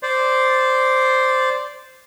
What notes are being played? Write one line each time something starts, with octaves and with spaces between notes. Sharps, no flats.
C5 D5